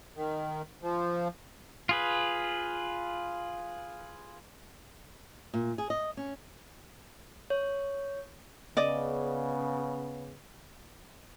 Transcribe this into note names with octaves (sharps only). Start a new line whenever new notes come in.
D#3
F3
F4 G#4 B4
A#2
G#4
D#5
C#4
C#5
C#3 B3 D5 D#5